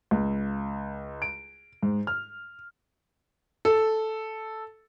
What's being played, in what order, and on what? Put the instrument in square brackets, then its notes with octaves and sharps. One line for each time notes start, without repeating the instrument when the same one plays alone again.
[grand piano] C#2
D7
G#2
F6
A4